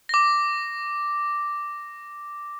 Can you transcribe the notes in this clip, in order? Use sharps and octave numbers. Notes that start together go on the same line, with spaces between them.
D6 A#6